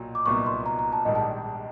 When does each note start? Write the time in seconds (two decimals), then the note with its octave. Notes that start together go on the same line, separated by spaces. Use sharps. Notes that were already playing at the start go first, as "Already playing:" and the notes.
Already playing: B1 A#2 F#3
0.15 D6
0.26 C2 A#2 F#3 B3 D#4 C#6
0.46 C6
0.66 A#5
0.79 A#5
0.93 A5
1.05 A#1 G#2 D#3 G3 D#5
1.15 A5